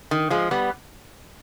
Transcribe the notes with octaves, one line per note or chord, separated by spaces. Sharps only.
D#3
F3 G#3
G3 B3